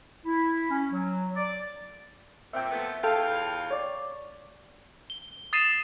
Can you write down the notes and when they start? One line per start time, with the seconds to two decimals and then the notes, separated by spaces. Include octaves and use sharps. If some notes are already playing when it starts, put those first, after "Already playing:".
0.25 E4
0.70 C#4
0.91 F#3
1.36 D5
2.53 A#2 C4 E5 G5
2.70 F3 A3 B3
3.03 E2 F4 A4 F5 G5
3.71 C#5 D5
5.10 G7
5.53 D#6 A6 C7 D#7 E7